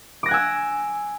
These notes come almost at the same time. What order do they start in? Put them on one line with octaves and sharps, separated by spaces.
D6 A#6 F#6 G#5 E6